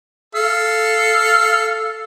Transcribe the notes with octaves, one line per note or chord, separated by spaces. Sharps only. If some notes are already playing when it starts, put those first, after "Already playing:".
A4 F5